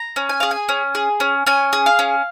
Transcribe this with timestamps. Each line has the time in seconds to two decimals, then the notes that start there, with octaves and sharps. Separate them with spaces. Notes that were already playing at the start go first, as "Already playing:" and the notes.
Already playing: A#5
0.16 C#4
0.29 G#5
0.40 G#4 F5
0.51 G#5
0.69 C#4
0.95 G#4
1.20 C#4
1.46 C#4 G#5
1.73 G#4
1.86 F5
1.99 C#4